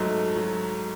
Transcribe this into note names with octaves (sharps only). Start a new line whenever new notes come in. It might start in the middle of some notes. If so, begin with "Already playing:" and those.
Already playing: G#2 F#3 A3
F#3